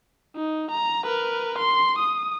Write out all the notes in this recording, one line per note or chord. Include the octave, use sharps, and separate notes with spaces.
D#4
A#5
A#4 B4
C6
D#6